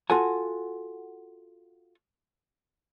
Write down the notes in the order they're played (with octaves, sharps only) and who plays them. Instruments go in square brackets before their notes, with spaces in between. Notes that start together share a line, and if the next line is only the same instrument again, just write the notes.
[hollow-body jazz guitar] F4 F#4 A4 F#5 G#5